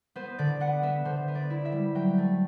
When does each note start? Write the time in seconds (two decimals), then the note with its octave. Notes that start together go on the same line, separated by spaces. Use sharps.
0.16 B3 C5
0.38 D3 D5
0.60 B3 F#5
0.83 B3 E5
1.05 D3 C5
1.28 B3
1.35 D5
1.50 E4
1.65 E5
1.72 G3
1.95 F#3 G5
2.18 A3